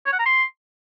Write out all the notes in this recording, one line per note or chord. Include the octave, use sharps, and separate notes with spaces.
C#5
F#5
A#5
C6